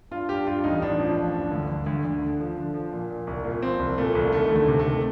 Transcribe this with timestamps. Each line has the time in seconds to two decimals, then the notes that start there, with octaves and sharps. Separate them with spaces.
0.11 G2 F4
0.29 G2 G4
0.47 G2 F4
0.64 A1 D#4
0.82 A1 D4
1.00 F3
1.16 A1
1.34 G2
1.51 D2
1.69 D2
1.86 D2
2.05 D2
2.22 D3
2.40 F3
2.57 D3
2.74 F3
2.93 A#2
3.10 A#2
3.27 C2
3.45 A#2
3.62 F3 C4
3.79 C2
3.98 A#2 A3
4.15 C2
4.32 D#3 A3
4.50 D2
4.56 A3
4.68 C3
4.79 A3
4.85 D#3